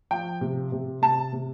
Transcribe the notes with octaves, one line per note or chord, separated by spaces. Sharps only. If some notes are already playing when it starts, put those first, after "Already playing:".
F3 G5
C3
C3
C3 A5
C3